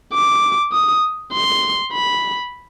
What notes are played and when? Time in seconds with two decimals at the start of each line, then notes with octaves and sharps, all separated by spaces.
0.14 D6
0.73 D#6
1.33 C6
1.93 B5